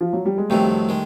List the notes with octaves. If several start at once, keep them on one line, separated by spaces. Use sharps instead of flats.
F3
F#3
G3
G#3
F2 C3 D#3 F#3 G3 A3
D#3 G#3